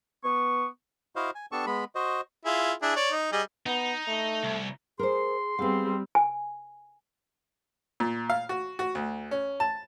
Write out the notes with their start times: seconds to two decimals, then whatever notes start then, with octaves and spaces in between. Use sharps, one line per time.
0.24 B3 C#6
1.16 E4 F#4 C5 D#5 F5
1.35 G#5
1.52 B3 D4 G4 A4 A5 C#6
1.66 G#3 B3 B5
1.95 F#4 C5 D#5
2.45 E4 F4 G#4
2.82 D4 E4 G#4
2.96 C#5 D5
3.12 D#4
3.32 G3 G#4 D#5
3.66 B3 D#4
4.08 A3
4.44 C2
4.99 G#4 A#4 C5 C6
5.59 G3 B3 C4 G#4 F5
6.15 G#5
8.00 A#2
8.30 F5
8.49 F#4
8.79 F#4
8.95 D2
9.31 C#4
9.60 A5